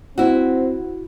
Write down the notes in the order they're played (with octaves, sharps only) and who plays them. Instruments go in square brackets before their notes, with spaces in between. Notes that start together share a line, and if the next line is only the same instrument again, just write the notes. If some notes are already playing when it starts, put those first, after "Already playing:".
[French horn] C4 [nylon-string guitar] E4 F#4